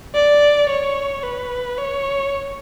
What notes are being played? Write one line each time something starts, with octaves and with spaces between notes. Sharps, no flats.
D5
C#5
B4
C#5